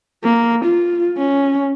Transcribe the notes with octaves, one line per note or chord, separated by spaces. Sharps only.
A#3
F4
C#4